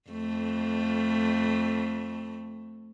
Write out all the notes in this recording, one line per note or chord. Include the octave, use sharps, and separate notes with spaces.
F2 A3